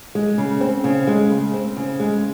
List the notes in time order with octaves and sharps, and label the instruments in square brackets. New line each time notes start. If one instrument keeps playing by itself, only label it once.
[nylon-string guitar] G#3
C#3
C4
C#3
G#3
C#3
C4
C#3
G#3